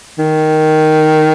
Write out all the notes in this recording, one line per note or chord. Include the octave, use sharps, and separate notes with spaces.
D#3